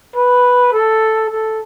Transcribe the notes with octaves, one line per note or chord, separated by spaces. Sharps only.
B4
A4
A4